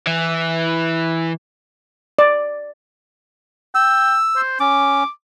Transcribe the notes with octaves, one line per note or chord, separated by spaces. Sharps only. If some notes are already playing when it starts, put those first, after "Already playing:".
E3
D5
G5 E6
C5
C#4 D6